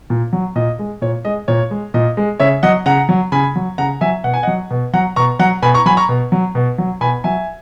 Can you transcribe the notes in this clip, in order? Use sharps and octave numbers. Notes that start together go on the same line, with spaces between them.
A#2
F#3
A#2 D#5
G#3
A#2 C#5
G#3 D#5
A#2 C#5
G#3
A#2 D#5
G#3
C#3 C#5 E5
F#3 D#5 F#5
C#3 F#5 A#5
F#3
C#3 G#5 B5
F#3
C#3 F#5 A#5
F#3 E5 G#5
B2 F#5
G#5
D#5 F#5
F#3
B2
F#3 F#5 A#5
B2 A#5 C#6
F#3 F#5 A#5
B2 G#5 B5
A#5 C#6
F#3 G#5 B5
A#5 C#6
B2
F#3
B2
F#3
B2 G#5 B5
F#3 E5 G#5